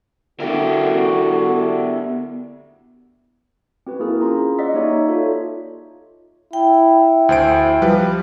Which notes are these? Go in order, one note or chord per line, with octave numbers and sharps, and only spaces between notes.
D3 B3 E4 F#4 G4 A#4
C4 F#4 B4
A#3 E4 G#4 A#4
C#4 F4 A#5 C6
C5 D5 D#5 F#5 E6 B6
A#3 D#4 G4 C#5 E5 A#5
F4 F#4 A4 C#5 E5
E4 G5
D2 C5 D7
F3 G3 B4